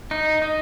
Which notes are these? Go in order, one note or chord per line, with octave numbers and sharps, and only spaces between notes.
D#4
D#4